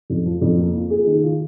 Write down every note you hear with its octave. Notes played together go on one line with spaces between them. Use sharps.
F2
F3
F2
A#3
F4
G#4
D#3
F4